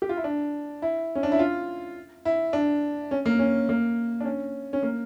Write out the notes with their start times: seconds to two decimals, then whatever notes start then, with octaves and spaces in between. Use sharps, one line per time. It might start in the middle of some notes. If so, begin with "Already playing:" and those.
0.02 G4
0.09 F4
0.17 E4
0.24 D4
0.82 E4
1.15 C#4
1.23 D4
1.32 E4
1.39 F4
2.25 E4
2.53 D4
3.11 C#4
3.26 A#3
3.39 C#4
3.69 A#3
4.21 D4
4.25 C#4
4.73 C#4
4.83 A#3